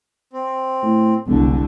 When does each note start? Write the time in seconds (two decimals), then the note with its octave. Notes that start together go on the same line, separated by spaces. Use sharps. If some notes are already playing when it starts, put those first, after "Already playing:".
0.33 C4
0.83 A2
1.27 E1 C2 D3